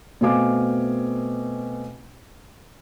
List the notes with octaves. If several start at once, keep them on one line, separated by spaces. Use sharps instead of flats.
B2 A3 C4 F5 G#5 D6